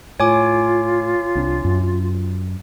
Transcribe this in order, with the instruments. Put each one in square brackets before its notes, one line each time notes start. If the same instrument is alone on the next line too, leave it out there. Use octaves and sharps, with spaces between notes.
[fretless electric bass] A2 [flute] F4 [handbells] C#5 G#5 D6
[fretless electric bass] C2 C4 D4
F#2